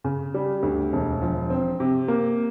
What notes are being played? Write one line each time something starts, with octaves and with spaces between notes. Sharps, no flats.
C#3
G3
D2
E1
F3
C4
C3
A#3